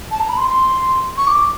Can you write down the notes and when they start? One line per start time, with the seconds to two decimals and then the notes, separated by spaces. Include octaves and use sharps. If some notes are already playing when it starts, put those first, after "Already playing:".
0.11 A5
0.20 A#5
0.29 B5
0.37 C6
1.18 C#6
1.27 D6